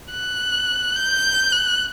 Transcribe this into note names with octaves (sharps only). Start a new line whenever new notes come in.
F#6
G6
F#6